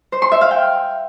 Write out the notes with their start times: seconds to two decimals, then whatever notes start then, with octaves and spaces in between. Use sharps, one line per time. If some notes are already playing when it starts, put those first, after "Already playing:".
0.12 C5
0.22 C6
0.32 E5
0.41 F5
0.51 G5